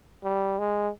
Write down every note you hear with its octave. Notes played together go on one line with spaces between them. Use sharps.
G3
G#3